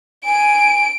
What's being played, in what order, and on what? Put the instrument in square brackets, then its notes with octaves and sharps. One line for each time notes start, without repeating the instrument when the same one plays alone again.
[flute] G#5 [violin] D7